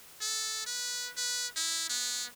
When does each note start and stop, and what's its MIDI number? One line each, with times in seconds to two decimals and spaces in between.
0.21 0.62 69
0.66 1.10 71
1.16 1.47 71
1.56 1.88 64
1.89 2.25 59